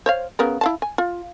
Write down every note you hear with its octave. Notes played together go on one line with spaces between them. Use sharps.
C5 C#5 F5
C#3 B3 A#4
E4 F5 A5
G#5
F4